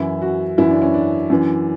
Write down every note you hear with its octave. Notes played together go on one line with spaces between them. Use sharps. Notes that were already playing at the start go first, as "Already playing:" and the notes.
Already playing: F#2 E3 E4
F#4
F#2 E3 E4
D4
C#4
D4
F#2 E3